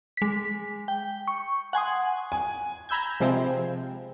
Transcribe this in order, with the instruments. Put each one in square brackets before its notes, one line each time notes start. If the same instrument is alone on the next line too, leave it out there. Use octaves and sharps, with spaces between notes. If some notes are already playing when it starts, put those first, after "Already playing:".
[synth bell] G#3 B6
G5
C#6
F#5 G#5 C6 D#6
[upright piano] G#5
[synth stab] A#5 B5 E6 G6 G#6
C3 F3 G#3 C4